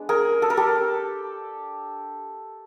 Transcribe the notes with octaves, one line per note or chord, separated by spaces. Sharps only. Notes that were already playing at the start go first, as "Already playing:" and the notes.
Already playing: G#3 B3 D4
G#4 A#4
A4
A#4
G4 A4